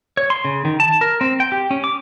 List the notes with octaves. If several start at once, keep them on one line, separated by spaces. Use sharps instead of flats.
C#5
C6
C#3
D#3
A5
A#4
C4
G5
G4
C#4
D6